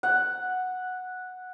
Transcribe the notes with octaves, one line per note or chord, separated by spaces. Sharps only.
F#5